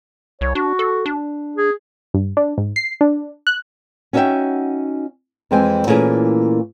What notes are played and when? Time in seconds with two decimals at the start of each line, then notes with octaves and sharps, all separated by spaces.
0.41 C2 C#5
0.55 D4 F#4
0.79 A4
1.06 D4
1.56 G#4
2.14 G2
2.37 D4
2.58 G#2
2.76 C7
3.01 D4
3.47 F#6
4.13 C#4 D#4 F#4 D#5 E5 G5
5.51 F2 E3 G#3 C4 G5 G#5
5.87 A#2 E3 A3 A#3 C#4 G#4